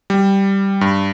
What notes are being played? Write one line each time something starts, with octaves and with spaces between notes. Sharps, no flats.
G3
G2